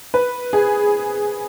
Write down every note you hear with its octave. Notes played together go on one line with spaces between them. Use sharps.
B4
G#4